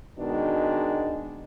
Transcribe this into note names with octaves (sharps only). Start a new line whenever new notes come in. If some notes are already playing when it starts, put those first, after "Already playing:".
B2 D#3 G#3 D4